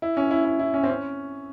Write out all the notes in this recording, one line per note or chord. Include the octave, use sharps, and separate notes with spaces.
E4
C#4
E4
E4
E4
C#4
C4
C#4